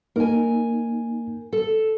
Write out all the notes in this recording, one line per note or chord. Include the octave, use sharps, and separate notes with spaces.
A#3 D#4 A#4 G#5
A4